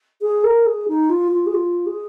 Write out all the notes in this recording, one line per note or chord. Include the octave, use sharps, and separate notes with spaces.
G#4
A#4
G#4
D#4
F4
F4
G#4
F4
G#4